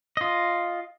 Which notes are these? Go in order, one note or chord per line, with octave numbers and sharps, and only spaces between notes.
F4 D#5